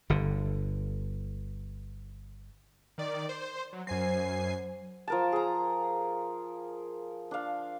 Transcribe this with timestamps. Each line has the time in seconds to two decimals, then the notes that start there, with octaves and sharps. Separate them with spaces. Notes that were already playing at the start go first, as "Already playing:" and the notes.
0.10 G1 D3
2.98 D#3 D5
3.29 C5
3.73 F#3
3.87 F#2 F#3 C5 G#5 C7
5.08 F3 A#4 A5
5.32 G#4 A#5
7.31 D4 F5